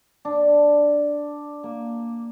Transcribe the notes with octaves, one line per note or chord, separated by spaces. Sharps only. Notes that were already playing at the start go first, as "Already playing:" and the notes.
D4
A#3